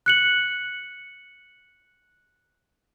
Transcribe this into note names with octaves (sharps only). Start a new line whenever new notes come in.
F#6 C#7 F#7